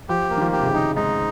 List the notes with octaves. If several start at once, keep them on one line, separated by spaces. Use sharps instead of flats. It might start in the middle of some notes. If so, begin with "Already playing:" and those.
F3 G4
A#3
D#3
F3
G4
C3
C#3
D#3 D#4
G#2 D#4